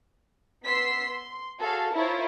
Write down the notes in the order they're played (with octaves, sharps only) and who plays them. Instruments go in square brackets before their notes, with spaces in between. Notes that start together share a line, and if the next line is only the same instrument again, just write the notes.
[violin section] B3 C6 E6 B6 C7
C6
F#4 G#4 A4 C#5 F5 A5
E4 F4 A#4 C5 C#5